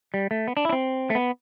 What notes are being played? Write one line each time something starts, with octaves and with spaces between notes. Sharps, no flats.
G3
A3
B3
D4
E4
D4
C4
A3
B3